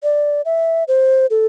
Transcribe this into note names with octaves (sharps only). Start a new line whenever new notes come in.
D5
E5
C5
A4